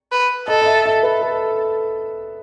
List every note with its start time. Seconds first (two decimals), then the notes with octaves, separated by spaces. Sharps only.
0.12 B4
0.48 A4 D#5
0.62 D#5
0.66 E5
0.86 E5
1.03 B4
1.21 A4